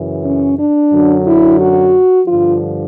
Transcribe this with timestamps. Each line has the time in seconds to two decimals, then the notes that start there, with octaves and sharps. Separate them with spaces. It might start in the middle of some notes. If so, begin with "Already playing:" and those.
Already playing: F#2 C#3 E3
0.25 C#4
0.59 D4
0.92 F#2 D3 F#3
1.26 E4
1.59 F#4
2.27 G2 D3 F3 F4